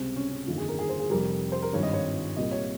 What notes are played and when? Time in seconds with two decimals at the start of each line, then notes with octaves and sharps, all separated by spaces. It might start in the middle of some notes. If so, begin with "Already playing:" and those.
Already playing: C#2 C3 G3 C4
0.16 C#4
0.31 C#4
0.47 G1 F2 D#3 A#3 F4
0.58 G#4
0.68 A#4
0.79 G#4
0.89 C5
1.00 G#4
1.10 F1 F2 C3 G3 A#4
1.52 C5
1.62 A#4
1.73 G#1 G2 F3 C#5
1.83 D#5
1.93 C#5
2.36 C2 A#2 G3 A#3 D#5
2.52 C#5